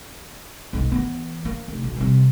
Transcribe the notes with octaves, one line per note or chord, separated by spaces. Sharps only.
B1 G#3
E3 B3
A#3
F1
B1
C3 G3